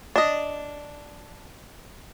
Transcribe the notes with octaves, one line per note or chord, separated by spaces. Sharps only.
D4 D#5